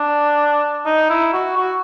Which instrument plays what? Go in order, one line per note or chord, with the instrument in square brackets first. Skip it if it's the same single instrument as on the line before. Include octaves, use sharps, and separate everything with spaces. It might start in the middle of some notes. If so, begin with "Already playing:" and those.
Already playing: [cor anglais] D4
D#4
E4
F#4
F#4